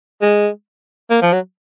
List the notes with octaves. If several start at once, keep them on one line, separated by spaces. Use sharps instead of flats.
G#3
A#3
F3
F#3